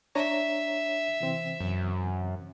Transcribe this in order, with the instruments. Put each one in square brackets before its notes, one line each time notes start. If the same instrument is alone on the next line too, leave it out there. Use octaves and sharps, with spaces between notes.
[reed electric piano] D4 C#5 A#5 [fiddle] E5
[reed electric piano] C3 E3 C4
[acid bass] F#2